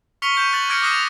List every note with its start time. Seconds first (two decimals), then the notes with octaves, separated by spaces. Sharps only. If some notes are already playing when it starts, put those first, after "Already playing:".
0.22 C#6 F6 B6 C#7 F7 G7
0.35 C#6 G6 E7
0.52 F#6 A6 F#7
0.69 D6 F6 G#6 A#6 C#7 D7
0.82 D6 D#6 F#6 A#6 C7 E7
0.93 F7